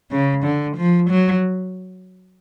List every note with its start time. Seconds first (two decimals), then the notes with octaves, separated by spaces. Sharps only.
0.11 C#3
0.44 D3
0.77 F3
1.10 F#3